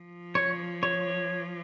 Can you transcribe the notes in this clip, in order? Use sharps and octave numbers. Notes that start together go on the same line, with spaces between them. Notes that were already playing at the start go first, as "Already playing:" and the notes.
Already playing: F3
C#5
C#5